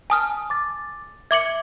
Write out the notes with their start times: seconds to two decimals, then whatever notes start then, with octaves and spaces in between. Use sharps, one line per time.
0.10 G#5 A5 D#6 F6
0.50 D6 A6
1.31 E5 D6 G#6 C#7 F#7